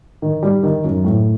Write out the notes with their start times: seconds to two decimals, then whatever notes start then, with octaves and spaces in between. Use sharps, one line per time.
0.22 D#3
0.43 G3
0.63 D#3
0.84 F#2
1.05 A2